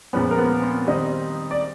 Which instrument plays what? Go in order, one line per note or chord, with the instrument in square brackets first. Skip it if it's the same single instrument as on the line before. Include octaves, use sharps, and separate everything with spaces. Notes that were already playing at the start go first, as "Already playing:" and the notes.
[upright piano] A#2 F3 G#3 B3 C#4 B4
A#4
B3 B4
C4 C5
D#3 G3 C4 D#4
D5